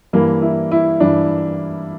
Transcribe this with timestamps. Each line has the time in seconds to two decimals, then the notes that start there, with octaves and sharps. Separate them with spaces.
0.13 G2 E3 A#3
0.42 E4
0.71 E4
1.00 G2 E3 D4